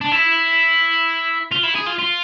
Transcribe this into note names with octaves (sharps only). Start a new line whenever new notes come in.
D4
E4
F4
E4
G#4
F4
F4